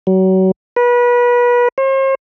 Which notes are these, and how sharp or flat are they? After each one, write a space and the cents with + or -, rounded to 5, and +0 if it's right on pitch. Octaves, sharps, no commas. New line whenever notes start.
F#3 +30
B4 -30
C5 +45